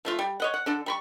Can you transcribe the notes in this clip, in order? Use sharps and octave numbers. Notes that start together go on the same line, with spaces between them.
F3 A3 F4
G3
C#5 D#5 F#5
F#5
D3 D4 A4
G3 B5 C#6